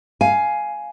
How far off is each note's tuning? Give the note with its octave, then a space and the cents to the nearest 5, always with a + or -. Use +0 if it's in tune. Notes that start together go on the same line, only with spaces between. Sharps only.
F5 +0 G#5 +10